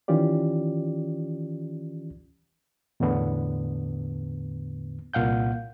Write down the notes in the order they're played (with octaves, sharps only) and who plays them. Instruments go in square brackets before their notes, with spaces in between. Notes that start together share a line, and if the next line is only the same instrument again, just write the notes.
[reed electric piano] D#3 E3 C#4 F4 G4 D5
E2 A2 D3 B3
C2 A#2 F5 F#5 G6